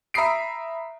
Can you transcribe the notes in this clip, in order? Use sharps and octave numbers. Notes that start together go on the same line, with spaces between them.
E5 A#5 B5 D#6 C7 D7